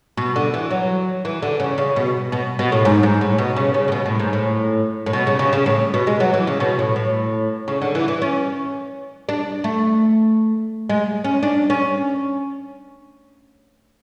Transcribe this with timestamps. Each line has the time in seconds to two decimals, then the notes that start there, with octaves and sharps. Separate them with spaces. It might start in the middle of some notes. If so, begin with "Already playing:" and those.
0.17 B2
0.36 D3
0.54 E3
0.71 F#3
1.25 E3
1.42 D3
1.60 C#3
1.78 C#3
1.96 B2
2.32 B2
2.59 B2
2.72 A2
2.85 G#2
3.03 G#2
3.21 A2
3.38 B2
3.56 C#3
3.74 C#3
3.88 A2
3.92 B2
4.06 A2
4.20 G#2
4.33 A2
5.06 A2
5.13 B2
5.27 C#3
5.39 C#3
5.53 C#3
5.66 A2
5.94 B2
6.07 G#3
6.20 F#3
6.34 E3
6.47 C#3
6.60 B2
6.79 A2
6.96 A2
7.68 C#3
7.82 D3
7.95 E3
8.08 E3
8.22 C#4
9.29 D4
9.64 A3
10.89 G#3
11.24 C#4
11.43 D4
11.70 C#4